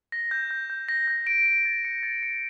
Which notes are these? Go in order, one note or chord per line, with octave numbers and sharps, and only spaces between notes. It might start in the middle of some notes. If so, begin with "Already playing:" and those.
A#6
G6
G6
G6
A#6
G6
D7
D7
A6
C#7
A6
C#7